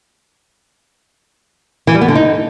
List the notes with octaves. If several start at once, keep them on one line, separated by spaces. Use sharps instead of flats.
E3
G3
B3
D3
D#4